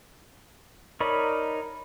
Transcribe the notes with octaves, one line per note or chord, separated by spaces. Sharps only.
D#4 A#4 C#5 D5 B5